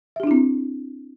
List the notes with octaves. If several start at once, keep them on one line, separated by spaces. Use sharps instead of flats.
C4 D4 E4 G4 E5